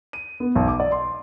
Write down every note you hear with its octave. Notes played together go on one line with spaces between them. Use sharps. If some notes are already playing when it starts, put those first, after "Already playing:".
D#7
B3
B1
D6
D5
C6